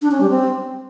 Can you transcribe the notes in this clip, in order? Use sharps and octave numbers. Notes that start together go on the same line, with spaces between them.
D4
C#4
G3
C4